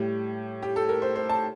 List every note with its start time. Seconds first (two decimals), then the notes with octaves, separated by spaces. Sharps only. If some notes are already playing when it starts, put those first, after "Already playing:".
Already playing: A2 G3 G4
0.62 G4
0.76 A4
0.89 A#4
1.02 C5
1.16 C5
1.30 A5